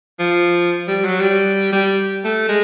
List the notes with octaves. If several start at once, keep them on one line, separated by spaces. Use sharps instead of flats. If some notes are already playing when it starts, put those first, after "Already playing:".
F3
G3
F#3
G3
G3
A3
G#3